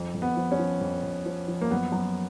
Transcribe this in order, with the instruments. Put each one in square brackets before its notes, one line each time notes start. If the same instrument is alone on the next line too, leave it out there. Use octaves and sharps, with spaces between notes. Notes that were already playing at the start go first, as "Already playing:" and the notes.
Already playing: [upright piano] F2
F2
B3
F3
C#4
F3
F2
F2
F3
F3
A#3
F#2 B3
F#2